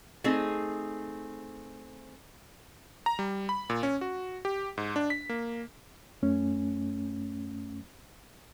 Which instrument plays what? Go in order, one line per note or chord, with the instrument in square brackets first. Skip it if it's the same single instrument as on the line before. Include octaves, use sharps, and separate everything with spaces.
[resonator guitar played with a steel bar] A3 C4 D#4 G#4
[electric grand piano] A#5
G3
B5
A#2
C#4
F#4
G4
G#2
D4
B6
A#3
[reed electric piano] F#2 A3 C#4